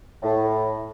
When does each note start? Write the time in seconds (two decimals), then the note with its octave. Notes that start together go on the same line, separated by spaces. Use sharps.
0.23 A2